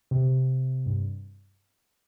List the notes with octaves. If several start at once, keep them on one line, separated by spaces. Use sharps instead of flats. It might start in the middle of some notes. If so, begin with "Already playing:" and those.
C3
G2